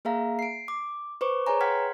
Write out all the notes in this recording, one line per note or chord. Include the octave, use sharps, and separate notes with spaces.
A#3 G#4 E5 F5 A#5
C7 D7
D6
B4 C5 C#6 D6
G#4 B4 C#5 G#5 A#5
F#5 G5 C6 F6 G#6 B6